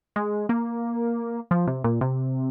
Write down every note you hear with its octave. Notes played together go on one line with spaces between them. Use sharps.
G#3
A#3
F3
C3
A#2
C3